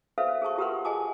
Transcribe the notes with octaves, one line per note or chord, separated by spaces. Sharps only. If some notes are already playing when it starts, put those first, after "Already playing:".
A4 B4 C5 E5 F5
G#4 A4 A5 C#6
F4 G4 A#4 B4 F#5 C6
G#4 D#5 G#5 A5 D6